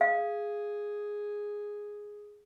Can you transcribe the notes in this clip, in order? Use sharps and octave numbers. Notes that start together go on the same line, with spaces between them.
G#4 F5